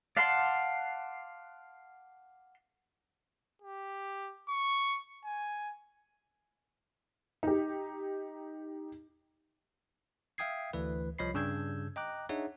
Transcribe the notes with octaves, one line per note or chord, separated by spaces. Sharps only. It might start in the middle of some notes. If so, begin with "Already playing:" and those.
D5 F5 F#5 A5 C6
G4
C#6
G#5
D#4 G4
E5 F5 G5 D#6 G#6 C7
D2 E3 B4
C2 F3 C#5 D#5 B5 C7
G2 C#3 D4 E6 G6 G#6
D#5 G5 A#5 D6 F#6
D4 D#4 G#4 C#5 E5 F#5